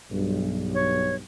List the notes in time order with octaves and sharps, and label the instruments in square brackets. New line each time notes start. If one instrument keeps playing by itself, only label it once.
[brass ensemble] B1 G2
[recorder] C#5